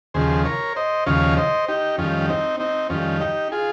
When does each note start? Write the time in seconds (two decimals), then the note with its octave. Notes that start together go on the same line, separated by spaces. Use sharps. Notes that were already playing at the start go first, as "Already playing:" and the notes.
0.14 D#2 C#3 F3 G#4 C5
0.45 A#4 C#5
0.76 C5 D#5
1.06 D#2 C#3 F3 C#5 F5
1.37 C5 D#5
1.68 D#4 G4
1.98 F2 D#3 G3 C#4 F4
2.29 C4 D#4
2.60 C4 D#4
2.90 F2 D#3 G3 C#4 F4
3.20 D#4 G4
3.52 F4 G#4